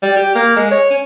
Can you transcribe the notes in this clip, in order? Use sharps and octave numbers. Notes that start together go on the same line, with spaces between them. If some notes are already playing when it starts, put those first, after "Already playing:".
G3
G4
A#3
G#3
C#5
C#4